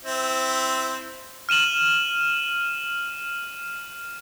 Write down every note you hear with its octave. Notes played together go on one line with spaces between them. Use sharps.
C4 E4
F6 D#7 E7 F#7